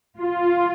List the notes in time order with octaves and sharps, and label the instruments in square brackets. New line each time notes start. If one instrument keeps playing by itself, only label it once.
[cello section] F4